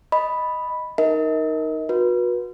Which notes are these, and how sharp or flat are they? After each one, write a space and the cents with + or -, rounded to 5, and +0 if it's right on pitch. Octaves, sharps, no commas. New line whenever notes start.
D#5 +0 B5 +0
D#4 +0 A#4 +0 D#5 +35
F#4 -30 B4 -30